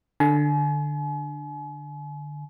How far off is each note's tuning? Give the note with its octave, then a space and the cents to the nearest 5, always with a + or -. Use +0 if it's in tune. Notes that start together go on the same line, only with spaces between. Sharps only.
D3 +10 G#5 +40